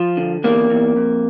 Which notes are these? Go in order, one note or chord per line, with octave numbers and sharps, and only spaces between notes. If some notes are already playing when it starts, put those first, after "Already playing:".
Already playing: F3 F4
D3
E2 A#3
E2
F2